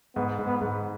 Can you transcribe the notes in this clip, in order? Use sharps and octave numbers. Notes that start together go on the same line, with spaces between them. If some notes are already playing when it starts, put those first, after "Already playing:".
G#2 B3
G#2
B3
G#2